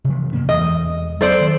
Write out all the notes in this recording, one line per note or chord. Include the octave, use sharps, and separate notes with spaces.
C3 E3 F3
F#2 A#3 C#4
E2 E3 G#3 D#5
F#3 B3 A4 C5 D5
D#3